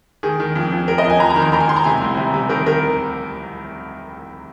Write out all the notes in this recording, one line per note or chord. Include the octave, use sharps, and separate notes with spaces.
D#3 G#4
D#3
F2
F2
F2 A#4
D#5
F2
G#5
F2 A#5
A#5
D#3
C6
D#3 A#5
G#5
D#3 C6
A#5
C3 G#5
C2
C3
C3
D#3 A#4
D#3 A#4